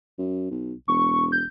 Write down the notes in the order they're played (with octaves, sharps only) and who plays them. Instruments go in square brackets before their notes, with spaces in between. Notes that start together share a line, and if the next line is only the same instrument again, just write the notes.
[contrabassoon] F#2
B1
[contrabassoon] E1 [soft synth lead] C#6
[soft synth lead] G6